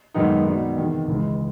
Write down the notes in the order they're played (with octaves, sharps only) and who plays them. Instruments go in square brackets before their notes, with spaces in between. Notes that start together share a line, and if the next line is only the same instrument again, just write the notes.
[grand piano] F#2 D#3 G#3 B3 D#4
B2 G3 B3 D#4 F#4
E2 C3 D#3
C#2 C#3 E3 G#3